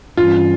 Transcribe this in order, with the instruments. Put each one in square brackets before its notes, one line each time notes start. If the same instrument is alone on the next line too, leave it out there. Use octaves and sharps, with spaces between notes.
[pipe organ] G2 E3 G3 C#4 [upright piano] F4